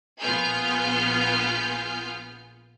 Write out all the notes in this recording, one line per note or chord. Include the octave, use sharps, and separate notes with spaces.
A#1 B3 F4 G#4 F6 G6